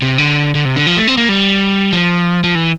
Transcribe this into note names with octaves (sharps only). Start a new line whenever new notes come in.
C3
D3
D3
C3
D3
F3
A3
C4
A#3
G3
F3
F3
E3